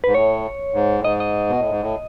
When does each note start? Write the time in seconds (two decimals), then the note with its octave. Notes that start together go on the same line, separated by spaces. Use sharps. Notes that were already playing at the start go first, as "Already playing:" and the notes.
0.04 G#2 B4
0.14 A2 C#5
0.74 G#2
0.99 A2
1.04 G#2 D#5
1.20 D#5
1.50 B2
1.60 A2
1.70 G#2
1.82 A2